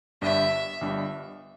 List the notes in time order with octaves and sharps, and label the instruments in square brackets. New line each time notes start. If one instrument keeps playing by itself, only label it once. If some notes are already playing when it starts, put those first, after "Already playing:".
[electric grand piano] G1 G2 G3 D4 [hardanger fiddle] E5
[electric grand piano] G1 G2 G3 D4